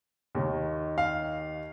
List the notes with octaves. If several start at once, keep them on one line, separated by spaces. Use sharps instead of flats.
D#2 D#3
F5